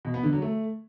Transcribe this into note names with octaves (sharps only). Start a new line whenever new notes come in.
B2
B3
D3
F#3
A3